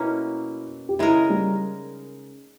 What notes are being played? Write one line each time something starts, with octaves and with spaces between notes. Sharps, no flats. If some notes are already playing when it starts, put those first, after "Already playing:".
Already playing: B2 A#3 C#4 E4
G4
C#3 G#3 D#4 E4 A#4
G3